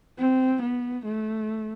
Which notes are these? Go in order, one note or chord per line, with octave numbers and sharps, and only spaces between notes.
C4
B3
A3